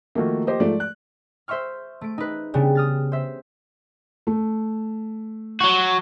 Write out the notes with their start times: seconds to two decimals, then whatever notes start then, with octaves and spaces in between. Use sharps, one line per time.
0.15 D#3 F3 A3 A#3 F#4
0.47 G4 C5 D#5
0.60 G#2 F3 A3 D5
0.80 F#6
1.48 C5 E5 C6 C#6 F6
2.01 A3 D7
2.18 D#4 B4
2.54 C#3 G3 B3 D4
2.75 D#6 F6 A6
3.12 C5 E5
4.27 A3
5.61 F#3 F#4